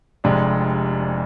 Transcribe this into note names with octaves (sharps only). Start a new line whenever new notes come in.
F1 F2 C3 G#3 D4